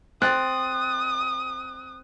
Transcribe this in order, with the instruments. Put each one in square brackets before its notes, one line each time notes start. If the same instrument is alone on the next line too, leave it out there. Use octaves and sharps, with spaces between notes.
[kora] C4 [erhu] D#6 [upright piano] F#6 A6